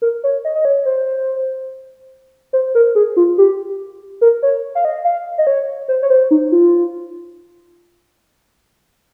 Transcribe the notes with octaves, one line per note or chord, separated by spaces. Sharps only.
A#4
C#5
D#5
D#5
C#5
C5
C5
A#4
G#4
F4
G4
A#4
C#5
F5
D#5
F5
D#5
C#5
C5
C#5
C5
D#4
F4